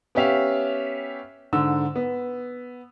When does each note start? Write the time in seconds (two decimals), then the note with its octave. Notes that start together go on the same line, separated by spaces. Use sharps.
0.15 B3 C#4 G4 E5 F5
1.53 G#2 D3 E6
1.96 B3